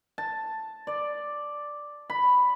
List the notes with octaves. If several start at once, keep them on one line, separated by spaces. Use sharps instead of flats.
A5
D5
B5